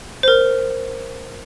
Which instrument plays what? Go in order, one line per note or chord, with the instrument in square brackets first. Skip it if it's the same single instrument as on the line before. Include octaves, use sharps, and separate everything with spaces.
[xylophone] A#4 C5